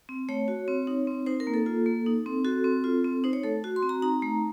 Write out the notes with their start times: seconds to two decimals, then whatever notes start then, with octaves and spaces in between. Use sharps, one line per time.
0.09 C4
0.29 A3 C#5
0.48 F#4
0.68 C4
0.87 D#4
1.07 C4
1.26 D#4 C5
1.40 A#4
1.47 A#3
1.54 A4
1.66 F4
1.86 A#3
2.06 D#4
2.26 C4
2.45 F#4 A4
2.64 C4
2.84 F4
3.04 C4
3.24 D#4 C5
3.33 C#5
3.44 A3 A4
3.64 F#4
3.76 C6
3.82 C4
3.89 A#5
4.02 D#4 A#5
4.22 A3